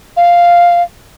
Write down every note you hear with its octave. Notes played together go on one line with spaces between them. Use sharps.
F5